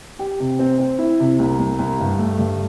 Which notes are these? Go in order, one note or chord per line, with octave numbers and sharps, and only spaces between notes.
G4
C3
C4
C4
E4
C3
C2
C2
C2
G2
A3
G2